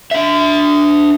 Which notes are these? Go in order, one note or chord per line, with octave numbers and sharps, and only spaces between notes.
D4 E5